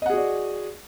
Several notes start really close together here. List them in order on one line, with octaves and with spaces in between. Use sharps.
D#5 F#5 G#4 F#4 D5